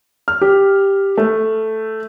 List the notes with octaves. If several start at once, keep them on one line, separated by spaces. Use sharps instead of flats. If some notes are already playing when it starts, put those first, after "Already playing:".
F6
G4
A3